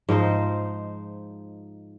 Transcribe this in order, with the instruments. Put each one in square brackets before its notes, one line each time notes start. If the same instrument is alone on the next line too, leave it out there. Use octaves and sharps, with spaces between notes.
[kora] G#2 F3 D#4 C5